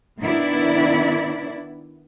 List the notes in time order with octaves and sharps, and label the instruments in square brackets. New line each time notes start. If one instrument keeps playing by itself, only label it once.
[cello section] D#3 B3 D4 E4 D5